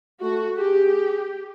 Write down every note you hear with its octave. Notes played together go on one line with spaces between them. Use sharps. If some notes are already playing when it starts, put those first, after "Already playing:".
A3 F#4
G4 G#4